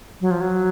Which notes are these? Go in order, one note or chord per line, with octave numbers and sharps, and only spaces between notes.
F#3
F3
F#3